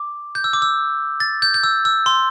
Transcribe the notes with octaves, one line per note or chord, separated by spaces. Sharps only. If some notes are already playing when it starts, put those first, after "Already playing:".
Already playing: D6
G6
E6
D6
E6
A6
G6
G6
E6
E6
C6